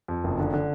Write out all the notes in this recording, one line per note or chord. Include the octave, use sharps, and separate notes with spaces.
F2
F#1
D3
D3